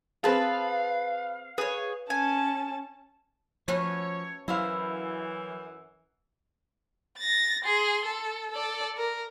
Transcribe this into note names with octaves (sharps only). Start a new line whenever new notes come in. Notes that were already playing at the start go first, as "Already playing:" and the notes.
B3 C4 G#4 B4 F5 A5
G#4 B4 C#5
C#4 G#5 A5
F3 A3 C#4 F#4 B4 C#5
F#2 E3 F#3 E4 C5 F5
A6 A#6
G#4 C6
A4
A4 D5
A#4